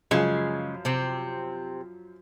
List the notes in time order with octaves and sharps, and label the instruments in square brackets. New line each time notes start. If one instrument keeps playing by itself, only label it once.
[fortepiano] F#2 F3 F5 [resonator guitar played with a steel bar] C#3 G#3
[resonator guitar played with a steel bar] C3 C4